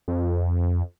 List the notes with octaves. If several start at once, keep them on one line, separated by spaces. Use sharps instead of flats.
F2